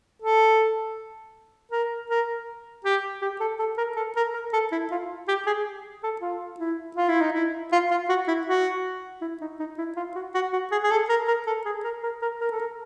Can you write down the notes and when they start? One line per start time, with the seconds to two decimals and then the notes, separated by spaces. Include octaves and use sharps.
0.22 A4
1.72 A#4
2.10 A#4
2.85 G4
3.22 G4
3.41 A4
3.59 A4
3.78 A#4
3.96 A4
4.16 A#4
4.34 A#4
4.53 A4
4.72 E4
4.91 F4
5.28 G4
5.47 G#4
6.04 A4
6.21 F4
6.60 E4
6.97 F4
7.09 E4
7.21 D#4
7.33 E4
7.72 F4
7.91 F4
8.09 F#4
8.28 E4
8.47 F#4
9.21 E4
9.41 D#4
9.60 D#4
9.78 E4
9.97 F4
10.16 F#4
10.35 F#4
10.53 F#4
10.72 G#4
10.83 G#4
10.91 A4
11.09 A#4
11.28 A#4
11.47 A4
11.66 G#4
11.84 A#4
12.04 A#4
12.22 A#4
12.41 A#4
12.52 A4
12.59 A#4